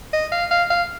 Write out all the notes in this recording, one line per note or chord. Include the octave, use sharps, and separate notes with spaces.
D#5
F5
F5
F5